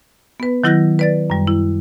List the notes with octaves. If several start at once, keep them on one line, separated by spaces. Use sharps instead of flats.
B3 B4
D#3 F#3 E4 F#6 G6 A#6
B4 D5 A6
F#2 G3
E4